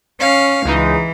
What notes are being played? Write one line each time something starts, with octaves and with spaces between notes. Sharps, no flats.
C#4 F5
C#2 E3 G#3 D#4